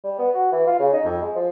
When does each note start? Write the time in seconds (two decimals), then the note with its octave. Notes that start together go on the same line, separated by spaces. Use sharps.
0.04 G3
0.19 B3
0.34 F#4
0.52 E3
0.67 F4
0.79 C#3
0.93 D#4
1.05 F2
1.21 G#3
1.35 F3